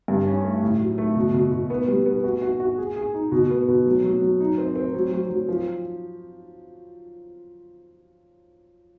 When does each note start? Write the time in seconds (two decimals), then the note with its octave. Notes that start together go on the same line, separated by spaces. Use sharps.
0.08 G2
0.26 C#4
0.44 A3
0.62 A2
0.81 F#3
0.98 A3
1.16 B2
1.34 B2
1.52 B2
1.70 B3
1.88 G3
2.06 B3
2.24 F#4
2.42 F#4
2.60 F#4
2.78 G#4
2.96 G#4
3.14 D#4
3.32 B2
3.50 B3
3.68 B2
3.86 F#3
4.04 F#3
4.22 F#3
4.40 D#4
4.58 C4
4.76 C4
4.94 F#3
5.12 F#3
5.30 F#3
5.48 F3